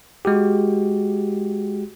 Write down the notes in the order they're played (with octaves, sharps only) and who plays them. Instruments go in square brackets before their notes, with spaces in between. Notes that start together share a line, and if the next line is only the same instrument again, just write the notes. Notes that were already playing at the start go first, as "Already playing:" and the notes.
[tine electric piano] G#3 F#4 G4